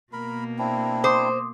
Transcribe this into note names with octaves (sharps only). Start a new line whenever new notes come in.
B2 A#3 A#4 B5
C4 D4 E4
C5 C6 D6 D#6